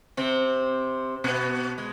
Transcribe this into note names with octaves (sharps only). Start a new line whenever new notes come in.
C3 C4
B2 B3
G#3